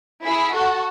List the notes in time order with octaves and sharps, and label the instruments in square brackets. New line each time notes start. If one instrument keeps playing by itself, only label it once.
[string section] E4 G#4
F#4 A4